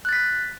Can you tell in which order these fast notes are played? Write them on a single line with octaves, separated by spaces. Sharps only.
F#6 A6 B6